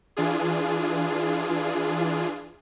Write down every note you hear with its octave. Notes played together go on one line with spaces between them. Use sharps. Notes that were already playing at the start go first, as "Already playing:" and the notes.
E3 D4 F4 G#4